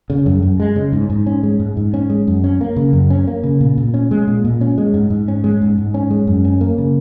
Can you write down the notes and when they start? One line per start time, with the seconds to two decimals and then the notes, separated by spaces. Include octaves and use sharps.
0.10 C#3
0.26 F#2
0.42 F#2
0.60 G#3
0.76 C#3
0.93 G#2
1.10 G#2
1.26 C#4
1.43 G#3
1.60 G#2
1.77 G#2
1.94 C#4
2.10 G#3
2.27 F#2
2.44 C#4
2.61 A#3
2.76 C#3
2.93 F#2
3.10 C#4
3.27 A#3
3.43 C#3
3.61 A#2
3.77 A#2
3.94 C#4
4.11 G#3
4.27 A#2
4.45 A#2
4.61 C#4
4.78 G#3
4.94 G#2
5.10 G#2
5.28 C#4
5.44 G#3
5.62 G#2
5.78 G#2
5.94 C#4
6.11 G#3
6.27 F#2
6.45 C#4
6.61 A#3
6.78 C#3